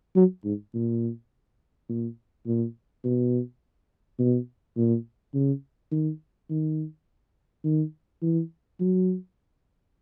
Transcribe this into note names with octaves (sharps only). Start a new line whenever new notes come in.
F#3
G#2
A#2
A#2
A#2
B2
B2
A#2
C#3
D#3
D#3
D#3
E3
F#3